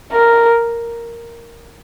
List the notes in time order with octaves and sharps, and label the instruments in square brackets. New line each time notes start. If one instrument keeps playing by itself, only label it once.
[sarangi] A#4